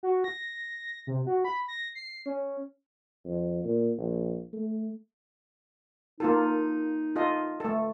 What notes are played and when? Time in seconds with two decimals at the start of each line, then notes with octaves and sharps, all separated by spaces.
0.03 F#4
0.24 A#6
1.07 C3
1.27 F#4
1.44 B5
1.68 A#6
1.95 C7
2.26 C#4
3.25 F2
3.64 A#2
3.98 A#1
4.53 A3
6.20 A#3 D#4 F4 A4
7.16 F4 A4 D#5
7.60 A3 A4